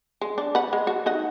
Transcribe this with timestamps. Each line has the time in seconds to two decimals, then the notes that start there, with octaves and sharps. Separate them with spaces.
0.21 G#3
0.38 D4
0.55 B4 F#5
0.73 G#3
0.87 F#4
1.06 D#4 D#5 F#5